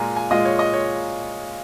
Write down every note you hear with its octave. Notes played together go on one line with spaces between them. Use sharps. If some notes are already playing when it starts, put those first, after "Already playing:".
Already playing: A#2 G#3 F4 G#5 A#5
G#5
A#2 G#3 F4 D#5
C#5
D#5
C#5